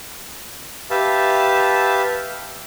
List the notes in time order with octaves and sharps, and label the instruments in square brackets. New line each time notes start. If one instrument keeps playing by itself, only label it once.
[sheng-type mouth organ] G4 B4 E5 F5 A5